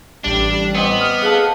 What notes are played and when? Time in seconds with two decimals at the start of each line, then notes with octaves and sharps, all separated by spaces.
0.24 A1 G3 D4
0.75 B3 C4 D#5 D6
1.00 D#6 F6
1.22 G#4 A4 F5 F#5 B6